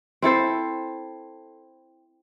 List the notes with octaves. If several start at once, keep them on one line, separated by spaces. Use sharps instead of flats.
C4 E4 A4 C5